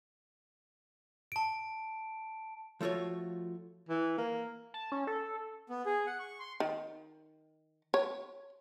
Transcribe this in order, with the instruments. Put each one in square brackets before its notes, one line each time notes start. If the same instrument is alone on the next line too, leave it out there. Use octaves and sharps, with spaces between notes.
[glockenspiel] A5 D7
[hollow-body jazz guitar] F3 A3 F4 F#4 C#5
[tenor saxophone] E3
A#3
[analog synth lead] A5
C#4
A4
[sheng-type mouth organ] B3
G#4
F#5
C#6
C6
[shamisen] D#3
C#5